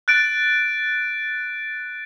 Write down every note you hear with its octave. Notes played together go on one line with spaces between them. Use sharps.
F#6 A6 D7